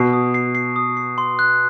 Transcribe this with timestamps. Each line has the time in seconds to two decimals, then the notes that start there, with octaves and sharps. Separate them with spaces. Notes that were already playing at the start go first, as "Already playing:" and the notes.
Already playing: B2 C7
0.13 D#6
0.34 C7
0.55 C7
0.76 D#6
0.97 C7
1.18 C6
1.39 F#6